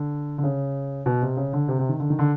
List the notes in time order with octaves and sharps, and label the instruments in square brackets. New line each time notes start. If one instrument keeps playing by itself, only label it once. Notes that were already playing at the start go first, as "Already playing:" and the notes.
Already playing: [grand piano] D3
D3
C#3
B2
C3
C#3
D3
C3
C3
D#3
D3
D#3
D3